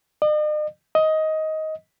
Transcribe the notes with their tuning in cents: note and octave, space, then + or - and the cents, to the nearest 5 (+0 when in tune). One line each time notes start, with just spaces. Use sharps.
D#5 -45
D#5 +15